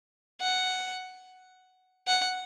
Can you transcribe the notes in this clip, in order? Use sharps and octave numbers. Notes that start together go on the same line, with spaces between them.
F#5
F#5